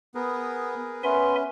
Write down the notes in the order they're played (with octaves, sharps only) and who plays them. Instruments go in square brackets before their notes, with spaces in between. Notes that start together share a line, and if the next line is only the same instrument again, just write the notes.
[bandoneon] B3 [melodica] G#4 A#4 B4
[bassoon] B3 [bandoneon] C#4 [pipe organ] E5 G#5 C6